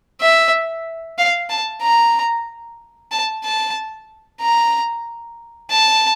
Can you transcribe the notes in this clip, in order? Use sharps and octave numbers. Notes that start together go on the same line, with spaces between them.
E5
F5
A5
A#5
A5
A5
A#5
A5